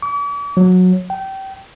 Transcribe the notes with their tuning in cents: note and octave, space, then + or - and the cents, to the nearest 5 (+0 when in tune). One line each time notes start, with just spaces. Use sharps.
D6 -45
F#3 -15
G5 -25